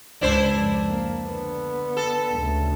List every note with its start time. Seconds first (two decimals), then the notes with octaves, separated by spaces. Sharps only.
0.21 C#2 G#2 D4 E4 C5
0.56 F2
0.88 A#3
1.25 D3 B3
1.97 A4
2.35 D2 C#3